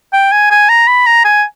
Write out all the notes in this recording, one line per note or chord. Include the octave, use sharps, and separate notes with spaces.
G5
G#5
G#5
A#5
B5
A#5
G#5